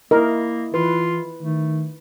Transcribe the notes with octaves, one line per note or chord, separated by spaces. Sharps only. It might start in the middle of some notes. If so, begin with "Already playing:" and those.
A#3 E4 A#4 D#5
E3 F4 B4
D#3 A3